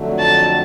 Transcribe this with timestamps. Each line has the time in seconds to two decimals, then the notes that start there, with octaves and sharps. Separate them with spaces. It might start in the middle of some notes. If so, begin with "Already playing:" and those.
Already playing: F2 D3 F#3 A3
0.19 A5